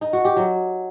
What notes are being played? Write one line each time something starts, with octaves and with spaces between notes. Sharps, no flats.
D#4
F#4
G4
F#3